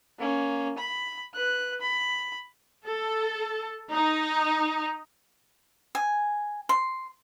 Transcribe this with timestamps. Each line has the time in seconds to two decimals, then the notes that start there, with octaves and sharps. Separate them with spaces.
0.19 A#3 C#4
0.78 B5
1.34 B4 F#6
1.81 B5
2.85 A4
3.90 D#4
5.95 G#5
6.69 C6